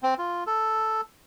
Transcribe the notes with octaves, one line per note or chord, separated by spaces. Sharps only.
C4
F4
A4